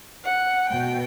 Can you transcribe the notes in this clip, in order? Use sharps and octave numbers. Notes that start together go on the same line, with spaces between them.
F#5
B2 G5